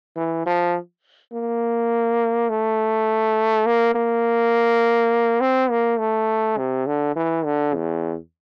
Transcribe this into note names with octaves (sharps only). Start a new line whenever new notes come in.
E3
F3
A#3
A3
A#3
A#3
C4
A#3
A3
C3
D3
E3
D3
E2